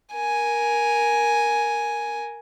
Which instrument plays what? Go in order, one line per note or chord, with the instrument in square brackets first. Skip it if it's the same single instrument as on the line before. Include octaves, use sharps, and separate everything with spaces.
[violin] A#4 G#5